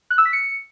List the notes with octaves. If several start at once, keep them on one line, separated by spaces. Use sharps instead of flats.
F#6
E6
B6
C#7